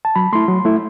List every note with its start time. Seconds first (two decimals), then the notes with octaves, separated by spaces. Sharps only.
0.05 A5
0.16 F#3 B5
0.33 A3 E4 C6
0.48 F#3
0.65 A3 E4